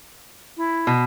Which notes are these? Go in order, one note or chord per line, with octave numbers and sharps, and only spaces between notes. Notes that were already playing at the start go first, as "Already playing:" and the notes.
E4
B2